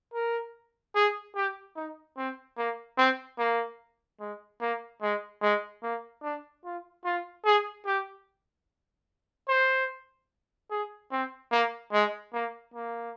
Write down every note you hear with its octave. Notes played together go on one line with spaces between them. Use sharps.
A#4
G#4
G4
D#4
C4
A#3
C4
A#3
G#3
A#3
G#3
G#3
A#3
D4
F4
F4
G#4
G4
C5
G#4
C4
A#3
G#3
A#3
A#3